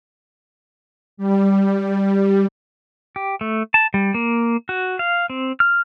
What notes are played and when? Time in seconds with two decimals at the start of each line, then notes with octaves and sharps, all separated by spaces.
1.17 G3
3.16 G4
3.41 A3
3.74 A5
3.94 G3
4.14 A#3
4.69 F#4
4.99 F5
5.30 C4
5.60 F6